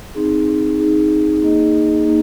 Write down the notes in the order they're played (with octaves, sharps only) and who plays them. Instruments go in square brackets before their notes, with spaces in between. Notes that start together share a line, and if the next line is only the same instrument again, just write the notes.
[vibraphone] C4 D#4 G#4
C4 D#4 G#4
A#3 D#4 G#4 D#5
A#3 D#4